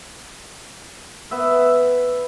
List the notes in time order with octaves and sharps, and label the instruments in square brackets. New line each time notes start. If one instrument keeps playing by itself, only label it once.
[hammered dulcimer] B3 E5